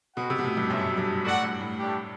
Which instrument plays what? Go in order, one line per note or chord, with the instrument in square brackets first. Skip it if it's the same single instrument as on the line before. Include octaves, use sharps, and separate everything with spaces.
[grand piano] B2 [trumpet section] C4 F#4 B4 F#5
[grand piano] C3
B2
A2
G2
[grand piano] F#2 [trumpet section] B3 F#4 A4 E5
[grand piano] G2
[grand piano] A2 [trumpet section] F#4 A4 D5 F#5
[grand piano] G2
A2
[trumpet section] A3 D4 G4